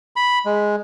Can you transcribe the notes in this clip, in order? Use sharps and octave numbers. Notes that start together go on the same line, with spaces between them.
B5
G#3